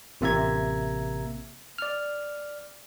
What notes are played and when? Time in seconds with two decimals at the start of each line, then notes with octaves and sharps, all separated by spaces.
0.21 A1 C3 A#3 E5 A#5 G#6
1.78 D5 F6